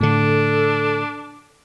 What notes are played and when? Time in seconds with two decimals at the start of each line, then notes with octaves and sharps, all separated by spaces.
0.01 A2 D3 D4 A4